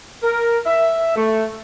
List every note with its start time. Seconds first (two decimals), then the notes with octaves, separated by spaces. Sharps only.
0.22 A#4
0.66 E5
1.16 A3